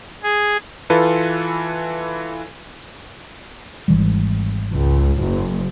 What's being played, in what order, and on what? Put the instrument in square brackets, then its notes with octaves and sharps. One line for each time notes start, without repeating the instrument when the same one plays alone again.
[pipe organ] G#4
[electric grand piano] E3 F4 A4 B4
[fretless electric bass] G#1 E3 G3
[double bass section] C#2
F#1